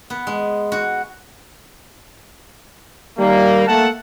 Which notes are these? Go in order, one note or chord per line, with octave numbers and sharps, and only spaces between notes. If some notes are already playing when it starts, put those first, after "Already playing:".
B3
G#3
F#4
D#3 G3 A#3
A3 A#3 F#5 A5